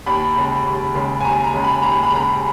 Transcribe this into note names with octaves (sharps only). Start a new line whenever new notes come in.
D#2 B5
C#3 G#3
D#2
C#3 G#3
G#5
D#2 A#5
A#5
C#3 G#3
B5
D#2 A#5
B5
C#3 G#3 A#5
B5